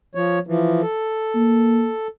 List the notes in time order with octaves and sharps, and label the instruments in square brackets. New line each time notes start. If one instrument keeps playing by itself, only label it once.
[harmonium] F3 C#5
E3 F3
A4
[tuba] A#3